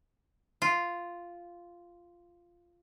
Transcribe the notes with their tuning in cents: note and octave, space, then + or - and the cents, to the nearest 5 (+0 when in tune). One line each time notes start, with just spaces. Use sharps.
F4 -5